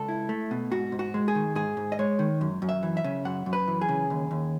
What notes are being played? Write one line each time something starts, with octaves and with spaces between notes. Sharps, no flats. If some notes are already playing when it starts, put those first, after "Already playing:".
Already playing: C#2 A4
E4
A3
B2
G#2 F#4
G#2
F#4
G#3
G#4
D#3
G#2 G#4
G#2
D#5
G#3 C#5
D#3
F#2
F#2
E5
E3
E5
C#3
F#2 F#5
F#2
B4
E3
G#4
C#3
D#2
D#2